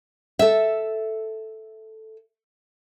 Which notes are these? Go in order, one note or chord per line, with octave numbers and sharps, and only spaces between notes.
A4 E5